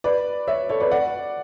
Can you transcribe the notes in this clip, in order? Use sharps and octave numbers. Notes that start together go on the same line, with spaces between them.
B4 D5
C#5 E5
A4 C#5
B4 D5
D5 F#5